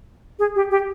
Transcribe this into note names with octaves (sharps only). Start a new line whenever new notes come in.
G#4
G4
G4